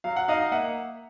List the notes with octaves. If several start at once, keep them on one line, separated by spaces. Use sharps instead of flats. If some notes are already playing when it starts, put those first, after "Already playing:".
F#3 F5
F#5
D#4 D#5 F5
A#3 E5 F#5